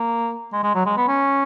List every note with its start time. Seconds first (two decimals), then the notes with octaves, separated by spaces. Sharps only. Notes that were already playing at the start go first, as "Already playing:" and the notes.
Already playing: A#3
0.52 G#3
0.63 G#3
0.75 F#3
0.86 G#3
0.97 B3
1.08 C#4